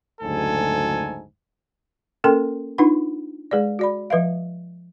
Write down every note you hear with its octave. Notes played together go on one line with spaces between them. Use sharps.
F#1 D2 G#2 A4 G#5
A#3 C#4 A4 A#4 G5 C6
D4 D#4 F4 B4 F#5 B5
G#3 G#4 B4 D5
F#4 D5 B5
F3 B4 E5 F5